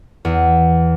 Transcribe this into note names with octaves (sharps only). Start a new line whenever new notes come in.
E2